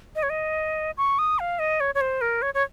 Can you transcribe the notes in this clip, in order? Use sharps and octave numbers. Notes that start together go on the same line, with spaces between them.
D#5
C#5
D#5
C#6
D#6
F5
D#5
C#5
C#5
C5
A#4
C#5
C#5